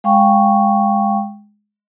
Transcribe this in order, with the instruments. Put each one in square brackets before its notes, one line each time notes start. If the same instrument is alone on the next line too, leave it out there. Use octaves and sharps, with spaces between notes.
[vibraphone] G#3 F5 G5 C#6